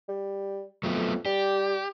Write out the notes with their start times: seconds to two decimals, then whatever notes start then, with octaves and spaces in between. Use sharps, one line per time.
0.09 G3
0.83 F2 F#3 A3 B3
1.25 G3 G4